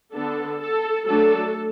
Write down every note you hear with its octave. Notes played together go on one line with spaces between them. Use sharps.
D3 B3 D4 A4
A4
F#3 A3 D4 A4